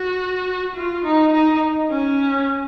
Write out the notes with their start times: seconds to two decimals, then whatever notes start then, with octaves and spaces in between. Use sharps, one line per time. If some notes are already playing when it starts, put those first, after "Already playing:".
Already playing: F#4
0.76 F4
1.05 D#4
1.33 D#4
1.91 C#4